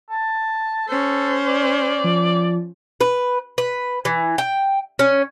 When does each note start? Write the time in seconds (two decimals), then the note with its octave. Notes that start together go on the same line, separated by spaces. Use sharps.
0.10 A5
0.88 C#4 A4 C5
1.47 D5
2.04 F3
3.01 B4
3.58 B4
4.05 E3
4.38 G5
4.99 C#4